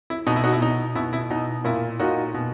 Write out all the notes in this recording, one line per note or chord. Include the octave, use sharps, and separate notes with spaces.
E4
B2 D#4
E4
D#4 F#4
E4
B2 D#4
B2 E4
E4
B2 D#4
A#2 E4
A#2 D#4 F#4
B2